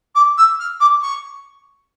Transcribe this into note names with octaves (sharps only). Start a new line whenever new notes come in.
D6
E6
F6
D6
C#6